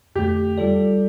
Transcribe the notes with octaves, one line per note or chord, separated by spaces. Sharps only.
F2 D3 A3 G4
G3 F4 A4 D5